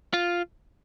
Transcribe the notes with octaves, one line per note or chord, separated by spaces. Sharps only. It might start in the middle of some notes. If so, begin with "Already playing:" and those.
F4